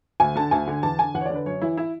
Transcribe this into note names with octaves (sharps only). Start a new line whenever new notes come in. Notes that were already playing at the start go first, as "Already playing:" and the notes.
D2 G#5
D3 A5
D2 G#5
D3
E2 A5
D3 G#5
E2 F#5
C#5
D3 D5
B4
F#2 C#5
E3 E4
E4